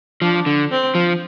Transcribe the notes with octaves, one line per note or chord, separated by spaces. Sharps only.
F3 D4
D3
C4
F3